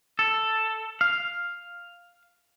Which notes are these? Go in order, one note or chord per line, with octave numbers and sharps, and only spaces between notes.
A4
F5